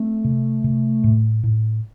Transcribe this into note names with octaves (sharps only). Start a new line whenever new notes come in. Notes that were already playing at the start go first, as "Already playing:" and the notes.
Already playing: A3 C4
C3
C3
A2
A2